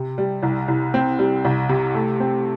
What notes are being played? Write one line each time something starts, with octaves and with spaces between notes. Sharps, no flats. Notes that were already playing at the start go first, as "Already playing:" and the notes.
Already playing: C3
G3
C2
C2
C4
G3
C2
C3
A3
C4